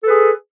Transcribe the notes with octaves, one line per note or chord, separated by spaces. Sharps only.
G#4 A4 B4